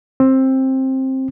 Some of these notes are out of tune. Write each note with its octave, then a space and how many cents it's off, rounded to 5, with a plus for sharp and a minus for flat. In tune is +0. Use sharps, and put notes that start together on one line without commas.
C4 +15